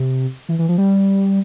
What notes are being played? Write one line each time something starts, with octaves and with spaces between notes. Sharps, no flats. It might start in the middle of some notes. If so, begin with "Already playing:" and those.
Already playing: C3
E3
E3
F3
G3